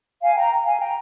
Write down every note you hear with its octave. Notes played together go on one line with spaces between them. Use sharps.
F5 G#5
G5 A#5
F5 G#5
G5 A#5